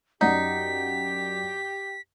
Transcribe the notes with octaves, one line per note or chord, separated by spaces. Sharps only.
F#2 D#4 G4 D5 F#5 B6